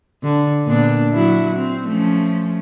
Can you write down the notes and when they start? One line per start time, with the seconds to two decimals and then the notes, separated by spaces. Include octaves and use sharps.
0.23 D3
0.66 A#2 B3 D4
1.12 F#3 E4 F#4
1.56 C4
1.87 F3 A3 C#4